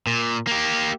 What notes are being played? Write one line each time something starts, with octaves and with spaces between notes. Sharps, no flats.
A#2
A#3 G4